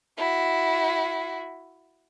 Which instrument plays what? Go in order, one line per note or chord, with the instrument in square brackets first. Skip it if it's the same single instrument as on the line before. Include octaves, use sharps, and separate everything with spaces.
[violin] E4 F#4